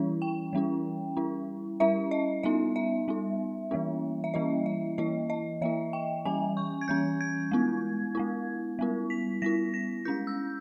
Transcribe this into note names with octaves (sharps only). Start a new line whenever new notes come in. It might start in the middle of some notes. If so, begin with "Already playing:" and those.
Already playing: E3 G3 C#4 E4
G5
E3 G3 C#4 E4
G3 C#4 E4
G3 C#4 E4 E5
D#5
G3 B3 D#4 E5
E5
G3 B3 D#4
E3 G3 A#3 C#4 E4
E5
E3 G3 A#3 C#4 E4 D#5
E5
E3 A#3 E4 D#5
D#5
E3 A#3 E4 E5
G5
E3 G3 C#4 G#5
C#6
G#6
E3 G3 C#4 G6
G#6
G#3 B3 E4
G#3 B3 E4
G3 B3 E4
B6
G3 B3 E4 A#6
A#6
G#3 C#4 E4 G6
E6